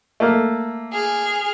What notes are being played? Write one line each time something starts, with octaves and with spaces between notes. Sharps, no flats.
A3 A#3
G#4 F6